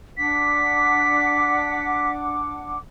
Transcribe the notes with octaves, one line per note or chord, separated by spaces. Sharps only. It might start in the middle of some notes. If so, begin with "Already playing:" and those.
D4 F#5 D6 B6